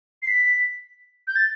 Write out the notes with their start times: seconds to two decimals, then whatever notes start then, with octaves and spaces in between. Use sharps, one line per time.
0.22 C7
0.27 B6
1.27 G6
1.36 A6